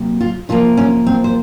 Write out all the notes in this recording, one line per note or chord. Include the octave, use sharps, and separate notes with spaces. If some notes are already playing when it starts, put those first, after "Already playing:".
Already playing: C3 F#3 A#3
F4
C3 F3 A#3 F4
C#4
C4
C5